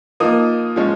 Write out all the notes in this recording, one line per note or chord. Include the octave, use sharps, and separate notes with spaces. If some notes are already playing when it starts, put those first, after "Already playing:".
F3 A#3 D#4 D#6
F3 G#3 C#4